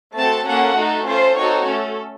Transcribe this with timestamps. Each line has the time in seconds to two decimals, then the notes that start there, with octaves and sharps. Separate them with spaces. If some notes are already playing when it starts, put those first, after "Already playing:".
0.15 A3 C4 F#4 A4 A5
0.45 A#3 C#4 A4 F#5
0.75 A3 D#4 F#4 A4
1.05 C#4 F4 A4 C5
1.36 C4 D#4 F#4 A4 C#5
1.65 A3 C#4 A4